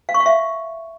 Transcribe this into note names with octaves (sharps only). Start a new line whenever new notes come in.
F5
C#6
F5
E5